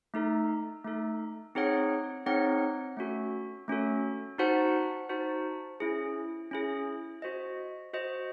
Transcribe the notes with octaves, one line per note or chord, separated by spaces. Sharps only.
A3 D#4 A4
A3 D#4 A4
C4 D#4 G#4 C#5 F#5
C4 D#4 G#4 C#5 F#5
A3 C#4 F#4 A4
A3 C#4 F#4 A4
D#4 F#4 C5 F#5 A5
D#4 F#4 C5 F#5 A5
C#4 E4 G#4
C#4 E4 G#4
F#4 C5 D#5
F#4 C5 D#5